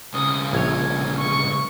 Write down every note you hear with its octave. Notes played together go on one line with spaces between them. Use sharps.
B1 C#3 D#6
A#1 C#5 G#6
C#6